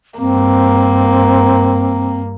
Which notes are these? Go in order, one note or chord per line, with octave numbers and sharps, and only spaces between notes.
G2 A#3 C4